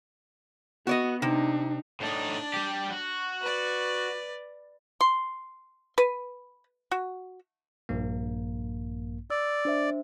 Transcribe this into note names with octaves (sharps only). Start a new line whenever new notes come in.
B3 F#4 D5 D#5
C3 D4 D#4
A2 D4 D#4 D5
G3 G4
F#4
B4 D5
C6
B4
F#4
A#1 G2 A#3
D5 E6
D4 C5 E5